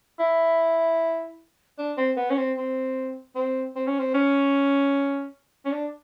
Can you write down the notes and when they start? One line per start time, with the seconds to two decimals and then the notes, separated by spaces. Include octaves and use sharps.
0.19 E4
1.78 D4
1.97 C4
2.17 B3
2.30 C#4
2.38 C4
2.57 C4
3.35 C4
3.76 C4
3.87 C#4
3.99 C4
4.14 C#4
5.65 C#4
5.72 D4